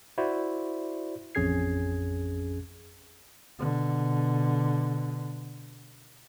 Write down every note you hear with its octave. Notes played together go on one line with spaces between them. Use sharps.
E4 F#4 C5 D5
A1 F2 C#4 G#4 G#6 C7
B2 D3